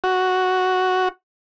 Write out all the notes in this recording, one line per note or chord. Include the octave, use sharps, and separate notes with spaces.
F#4